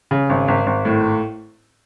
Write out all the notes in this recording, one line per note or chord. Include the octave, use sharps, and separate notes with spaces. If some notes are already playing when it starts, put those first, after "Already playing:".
C#3
G#1
G#1
G#1
A2